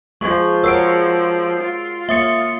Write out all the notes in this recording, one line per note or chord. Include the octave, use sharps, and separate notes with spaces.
F3 G#3 G#4 C#6
F#4 A#4 C#5 E6 C7 D7
F4
A#3 C#5 E5 D#6 C#7